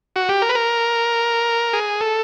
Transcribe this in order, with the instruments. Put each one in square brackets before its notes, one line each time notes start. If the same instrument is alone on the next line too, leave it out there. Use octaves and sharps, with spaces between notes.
[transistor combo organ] F#4
G4
A#4
B4
A#4
G#4
A4